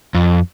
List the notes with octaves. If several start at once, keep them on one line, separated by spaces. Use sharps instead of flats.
F2